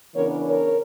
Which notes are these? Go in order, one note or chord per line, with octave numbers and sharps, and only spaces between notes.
C#3 E3 B3 D4 A#4 C#5
A#4 C#5